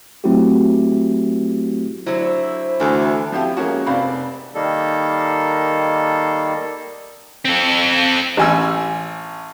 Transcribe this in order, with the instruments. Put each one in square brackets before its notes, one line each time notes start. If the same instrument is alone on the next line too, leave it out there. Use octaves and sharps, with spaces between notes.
[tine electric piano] F#3 A3 C4 E4 F#4 G4
[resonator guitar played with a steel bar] D3 F#3 [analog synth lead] E4 [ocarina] C5
[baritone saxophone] D2 [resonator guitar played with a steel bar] E3 A4
[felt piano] F3 C4 E4 G4
G#3 A#3 C#4 F#4
F1 C4 D5 F5 B5
[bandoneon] D#3 G3 A#3 A4
[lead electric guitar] C4 A4
[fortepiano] A1 G#5 E6